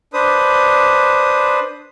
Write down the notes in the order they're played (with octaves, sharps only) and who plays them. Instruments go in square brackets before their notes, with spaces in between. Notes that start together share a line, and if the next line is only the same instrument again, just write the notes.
[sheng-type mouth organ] D4 B4 C5 D#6